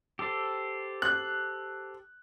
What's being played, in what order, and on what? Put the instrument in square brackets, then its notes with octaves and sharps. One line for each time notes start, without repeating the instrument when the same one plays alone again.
[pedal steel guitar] G4 A4 C5
[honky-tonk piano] F#6